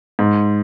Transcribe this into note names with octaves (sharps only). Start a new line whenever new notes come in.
G#2